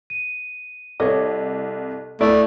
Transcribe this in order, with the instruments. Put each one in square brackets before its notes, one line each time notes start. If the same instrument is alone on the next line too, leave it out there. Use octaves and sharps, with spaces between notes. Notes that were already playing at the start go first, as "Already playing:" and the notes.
[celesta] D#7
[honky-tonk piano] C2 [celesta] A4 [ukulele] C#5 D#5
[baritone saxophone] A3 [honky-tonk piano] E4 [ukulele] D5